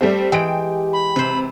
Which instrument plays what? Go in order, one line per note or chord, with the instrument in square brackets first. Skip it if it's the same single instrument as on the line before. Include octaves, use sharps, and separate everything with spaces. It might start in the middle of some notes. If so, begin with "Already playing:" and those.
[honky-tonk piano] G3 A3 C4 [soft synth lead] G4
[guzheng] E3 G#3 [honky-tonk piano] G5 D7
[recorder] B5
[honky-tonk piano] C3 [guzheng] B4 C5